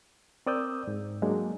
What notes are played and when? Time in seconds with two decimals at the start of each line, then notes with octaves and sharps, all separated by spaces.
0.46 C4 A#4 D5 D#6 E6 G6
0.87 G#2
1.22 F#3 G#3 A#3 D4